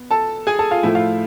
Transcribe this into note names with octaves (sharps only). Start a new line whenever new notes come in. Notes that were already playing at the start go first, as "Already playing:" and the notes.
Already playing: B3
A4 A5
G#4 G#5
A4 A5
F4 F5
A2 F3 A3 E4 E5
F4 F5